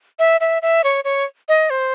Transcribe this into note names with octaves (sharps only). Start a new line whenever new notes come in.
E5
E5
E5
C#5
C#5
D#5
C5